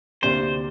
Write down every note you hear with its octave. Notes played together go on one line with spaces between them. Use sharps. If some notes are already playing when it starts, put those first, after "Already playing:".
D2 C3 A#3 G4 C5 D5